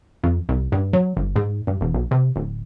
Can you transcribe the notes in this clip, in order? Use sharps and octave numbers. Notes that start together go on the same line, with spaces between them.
F2
C2
G2
F#3
G1
G#2
G2
E1
B1
C3
D1